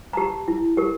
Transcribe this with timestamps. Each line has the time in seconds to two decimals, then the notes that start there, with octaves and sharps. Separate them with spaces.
0.13 G4 A5 A#5
0.48 E4
0.77 G4 A#4